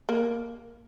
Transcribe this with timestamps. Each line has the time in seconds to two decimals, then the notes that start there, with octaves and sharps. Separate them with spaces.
0.09 A#3